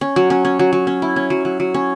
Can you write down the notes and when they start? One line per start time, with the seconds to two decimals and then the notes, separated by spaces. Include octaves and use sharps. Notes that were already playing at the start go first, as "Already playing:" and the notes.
0.01 C#4
0.16 F#3
0.30 C#4
0.45 C#4
0.59 F#3
0.73 F#3
0.87 C#4
1.02 E4
1.16 C#4
1.30 F#3
1.45 F#3
1.60 F#3
1.74 C#4